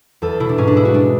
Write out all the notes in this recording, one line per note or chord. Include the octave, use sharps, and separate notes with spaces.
E2 A4
B2 E4
D4
G#2 C#4
D4
G#3 E4
F#4
G#3 D4